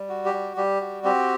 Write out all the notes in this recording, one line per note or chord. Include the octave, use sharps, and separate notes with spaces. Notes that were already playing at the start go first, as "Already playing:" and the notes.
Already playing: G3
F#4
G4
G3
G3 G4
F#4
C4 G4